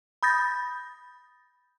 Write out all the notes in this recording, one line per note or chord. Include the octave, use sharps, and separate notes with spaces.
B5 D#6 G6 A6 A#6